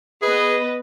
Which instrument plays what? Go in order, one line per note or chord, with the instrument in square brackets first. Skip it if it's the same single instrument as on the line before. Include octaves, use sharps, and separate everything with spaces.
[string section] B3 B4 [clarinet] G#4 [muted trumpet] D#5